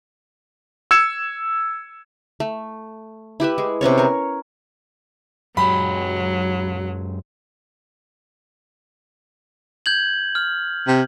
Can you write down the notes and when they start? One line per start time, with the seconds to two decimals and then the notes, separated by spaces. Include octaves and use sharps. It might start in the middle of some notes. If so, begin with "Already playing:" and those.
0.91 E6 G#6 C#7 E7
2.40 A3
3.40 E4 G4 B4 E5
3.58 G#3
3.81 C3 B3 C#4 C#5
3.98 A#4 C#5
5.57 F#2 F#3 G#3 G4 B5
9.86 G6 G#6 F#7
10.35 F6
10.87 C3